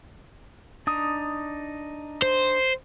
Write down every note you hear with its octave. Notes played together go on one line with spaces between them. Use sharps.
D4 D#4 D#6
C5